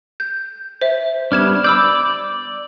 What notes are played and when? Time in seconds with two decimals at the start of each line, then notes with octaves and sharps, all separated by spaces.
0.20 G6
0.81 C5 E5
1.32 G3 B3 D4 F6 G#6 E7
1.64 D5 B5 D6 E6 G6